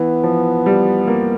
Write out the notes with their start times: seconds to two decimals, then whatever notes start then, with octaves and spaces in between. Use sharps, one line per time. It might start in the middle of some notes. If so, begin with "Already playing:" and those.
Already playing: E3 B3
0.24 F3
0.66 G3
1.08 A#3